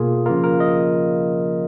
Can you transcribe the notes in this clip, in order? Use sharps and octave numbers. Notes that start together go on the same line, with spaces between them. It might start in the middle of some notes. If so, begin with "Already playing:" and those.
Already playing: B2 A#3 F4 G#4
C#3 F3 A#3 F4 A#4
A#4
D#5